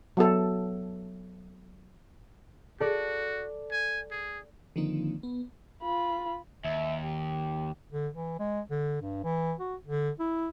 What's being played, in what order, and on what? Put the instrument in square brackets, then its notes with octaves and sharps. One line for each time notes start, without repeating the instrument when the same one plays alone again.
[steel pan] F#3 B3 A4
[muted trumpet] F#4 [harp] A4 D5
[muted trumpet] G#5
G#4
[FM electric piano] D3 D#3 F3 A#3 C4 D#4
B3
[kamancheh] F4 B5
[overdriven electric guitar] D#2 [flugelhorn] E5
[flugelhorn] G4
[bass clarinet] D3
E3
G#3
D3
G2
E3
F#4
D3
E4